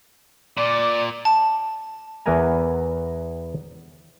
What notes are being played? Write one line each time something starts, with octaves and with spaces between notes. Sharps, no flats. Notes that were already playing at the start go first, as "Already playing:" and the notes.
A#2 D5
A5
E2 E3 B3 A#4 G#5 A#5